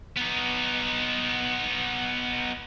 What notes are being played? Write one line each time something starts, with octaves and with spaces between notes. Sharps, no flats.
B3 D#4